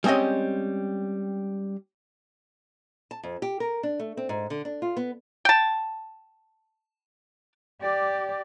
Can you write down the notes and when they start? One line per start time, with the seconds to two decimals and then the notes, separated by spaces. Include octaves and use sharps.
0.04 G3 G#3 C4 C#4 D#5
3.11 A5
3.23 F2
3.42 G4
3.60 A#4
3.83 D4
3.99 A3
4.17 C4
4.29 G#2
4.50 D3
4.65 D4
4.82 F4
4.97 B3
5.45 G5 A5
7.81 G4 D5